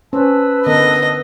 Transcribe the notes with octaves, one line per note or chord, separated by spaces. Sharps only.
C#4 B4 C5 A5 E6
D3 B3 A#4 D#5